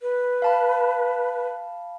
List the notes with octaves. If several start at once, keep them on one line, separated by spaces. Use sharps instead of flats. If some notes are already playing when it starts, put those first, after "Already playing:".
B4
F5 A5 B5